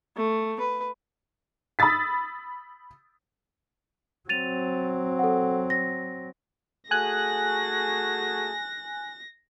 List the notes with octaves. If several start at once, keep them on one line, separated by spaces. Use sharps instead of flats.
A3
B4
B5 D#6 E6 A6 B6
F#3 C4 A6 D#7 F7
A4 F#5
A#6
A3 F#4 G#4 G#5 F#6 A#6